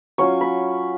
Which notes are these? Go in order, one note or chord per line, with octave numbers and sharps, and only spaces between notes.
F#3 C#4 F4 C#6
B5